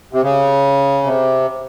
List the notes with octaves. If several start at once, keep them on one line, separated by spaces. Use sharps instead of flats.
C3
C#3
C3